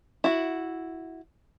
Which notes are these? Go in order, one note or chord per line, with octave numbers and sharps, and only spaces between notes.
E4 F#4